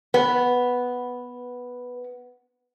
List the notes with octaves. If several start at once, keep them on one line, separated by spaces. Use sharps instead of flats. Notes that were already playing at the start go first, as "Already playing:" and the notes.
B3 B4